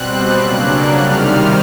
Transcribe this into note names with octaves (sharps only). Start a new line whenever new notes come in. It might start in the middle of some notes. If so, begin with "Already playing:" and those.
Already playing: B2 G3 C4 F#6
C#3 F#3 A#3 D4
C3 D#3 G3 F6